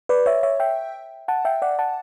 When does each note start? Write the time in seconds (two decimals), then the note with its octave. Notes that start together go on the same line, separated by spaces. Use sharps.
0.09 B4 D5
0.26 C#5 E5
0.43 C#5 E5
0.60 E5 G5
1.28 F#5 A5
1.45 E5 G5
1.62 D5 F#5
1.79 F#5 A5